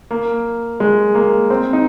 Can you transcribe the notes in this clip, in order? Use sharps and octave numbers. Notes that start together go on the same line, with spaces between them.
A#3
G#3
A#3
C4
D#4